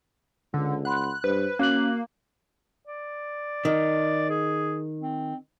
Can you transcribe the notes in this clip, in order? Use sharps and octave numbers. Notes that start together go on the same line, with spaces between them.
C#2 D3
F#5 B5 C6 F#6
G2 B4 C5
A#3 C#4 F#4 F#6 F#7
D5
D#3
G#4
C4